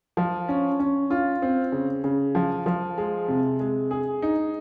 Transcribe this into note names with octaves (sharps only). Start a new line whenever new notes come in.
F3
C#4
C#4
F4
C4
C#3
C#3
F3
F3
G#3
C3
G#3
G#4
D#4